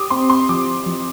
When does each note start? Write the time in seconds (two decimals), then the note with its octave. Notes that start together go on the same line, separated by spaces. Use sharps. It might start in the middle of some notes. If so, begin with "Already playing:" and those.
Already playing: G4 D6 D#6
0.11 C4 C6
0.30 C6
0.49 F3 D6
0.86 F3